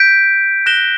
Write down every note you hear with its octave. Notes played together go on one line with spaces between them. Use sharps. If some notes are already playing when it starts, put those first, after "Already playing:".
Already playing: G6 B6 D7
F#6 A#6 E7 G7